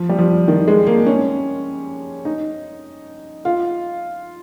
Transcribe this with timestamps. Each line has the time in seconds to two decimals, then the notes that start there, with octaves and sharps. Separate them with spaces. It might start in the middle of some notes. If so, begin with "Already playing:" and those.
Already playing: F3
0.09 G3
0.18 F3
0.48 D#3
0.68 G#3
0.87 A#3
1.06 C#4
2.25 D#4
3.45 F4